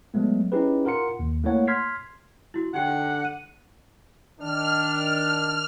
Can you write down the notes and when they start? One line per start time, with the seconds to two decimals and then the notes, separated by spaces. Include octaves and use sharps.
0.14 F#3 G#3 A3 B3
0.52 C#4 D#4 E4 G4 G#4 B4
0.85 F4 A#4 F#5 C6 C#7
1.19 D#2
1.44 A3 A#3 E4 C#5 F#5
1.68 C6 F6 G#6 B6 C7
2.54 E4 F#4
2.74 D3 D#4 G4 F#5 G5
3.25 D#7
4.39 D#3 D4 F6